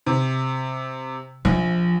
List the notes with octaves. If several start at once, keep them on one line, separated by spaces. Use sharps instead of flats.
C3
A#1 F3